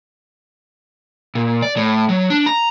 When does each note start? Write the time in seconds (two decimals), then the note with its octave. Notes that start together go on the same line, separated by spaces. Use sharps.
1.35 A#2
1.62 D5
1.77 A2
2.09 F#3
2.30 D4
2.46 A#5